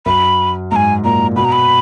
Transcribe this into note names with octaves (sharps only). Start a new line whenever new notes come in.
F#2 B5
G#2 G#5 A#5
A#2 A#5
B2 B5
A#5
B5